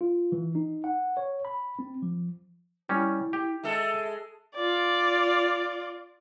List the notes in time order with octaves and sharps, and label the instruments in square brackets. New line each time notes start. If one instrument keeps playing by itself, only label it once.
[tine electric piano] F4
E3
D#4
F#5
C#5
B5
C4
F3
[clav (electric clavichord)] G3 C#4 [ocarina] E4
[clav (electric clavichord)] G4
[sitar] G#3 A4 [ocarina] E5
[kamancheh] F4 D5